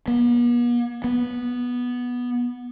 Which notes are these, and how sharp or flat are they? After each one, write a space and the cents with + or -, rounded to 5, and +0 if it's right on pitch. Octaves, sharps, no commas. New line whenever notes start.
B3 -45
B3 -10